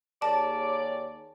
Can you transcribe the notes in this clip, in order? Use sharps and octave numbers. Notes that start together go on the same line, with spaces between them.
D#2 G4 G#4 A#4 C#5 D5 A5